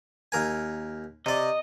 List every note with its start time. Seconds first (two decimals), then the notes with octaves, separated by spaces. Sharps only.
0.32 D#2 A#4 G#5
1.26 C3 D5 D#5